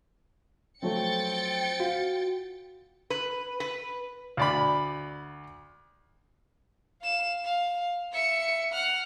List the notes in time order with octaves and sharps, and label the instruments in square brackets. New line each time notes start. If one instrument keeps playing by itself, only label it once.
[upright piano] F3 F#3 A3 [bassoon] C4 [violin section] G5 A6 C#7
[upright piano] F4 [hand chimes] F#4
[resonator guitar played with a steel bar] B4
B4
[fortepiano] D2 D5 B5
[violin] F5 E7
F5
E5 C#7
F#5 F6